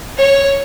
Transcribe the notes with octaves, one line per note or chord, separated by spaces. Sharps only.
C#5